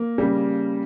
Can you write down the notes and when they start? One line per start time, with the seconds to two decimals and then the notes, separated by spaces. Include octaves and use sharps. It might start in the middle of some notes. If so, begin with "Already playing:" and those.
Already playing: A#3
0.18 C#3 G3